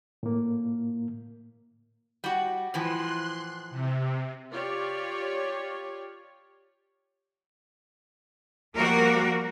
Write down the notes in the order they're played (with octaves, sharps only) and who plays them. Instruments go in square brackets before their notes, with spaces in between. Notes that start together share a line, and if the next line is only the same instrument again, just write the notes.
[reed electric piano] A2 A#3
[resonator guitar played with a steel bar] G3 F#4
[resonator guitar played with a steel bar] A2 E3 F3 [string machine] C6 F#6
[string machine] C3
[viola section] F4 G4 C#5 D5
[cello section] F3 G3 A#3 F#4 A#4